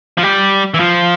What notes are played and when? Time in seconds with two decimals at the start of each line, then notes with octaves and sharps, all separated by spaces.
0.18 F3
0.23 G3
0.74 E3
0.80 F3